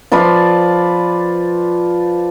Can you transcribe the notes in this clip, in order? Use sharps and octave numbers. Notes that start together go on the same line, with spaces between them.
F3 F4 B4 D5